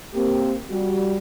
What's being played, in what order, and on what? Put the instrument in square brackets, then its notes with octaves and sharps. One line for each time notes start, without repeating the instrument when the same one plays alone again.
[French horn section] A#3 C4 G4
G3 F#4